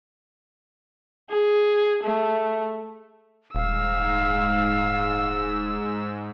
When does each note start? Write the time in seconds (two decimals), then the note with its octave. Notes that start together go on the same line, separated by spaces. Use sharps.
1.30 G#4
2.04 A3
3.55 D#1 G#2 F5 E6